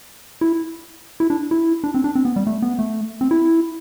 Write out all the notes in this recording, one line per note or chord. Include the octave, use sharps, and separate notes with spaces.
E4
E4
D4
E4
D4
C4
D4
C4
B3
G3
A3
B3
A3
C4
E4